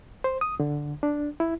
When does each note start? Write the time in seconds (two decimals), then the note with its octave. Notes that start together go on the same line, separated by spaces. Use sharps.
0.24 C5
0.41 D#6
0.60 D3
1.03 D4
1.40 E4